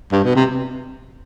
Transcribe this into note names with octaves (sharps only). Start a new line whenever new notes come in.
G2
B2
C3